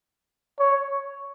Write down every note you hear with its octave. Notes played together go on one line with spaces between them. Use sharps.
C#5